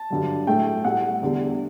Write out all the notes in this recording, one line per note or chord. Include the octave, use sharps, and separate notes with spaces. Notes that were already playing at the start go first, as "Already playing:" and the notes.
Already playing: A5
G2 D3 F#3
A2 F#3 A3 G5
A2 G3 F#5
E2 D3 G3